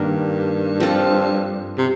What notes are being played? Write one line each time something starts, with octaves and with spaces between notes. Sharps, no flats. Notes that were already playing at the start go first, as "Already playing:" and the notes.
Already playing: G2 D#3 A#3 D4
F3 C4 F4 A4
C3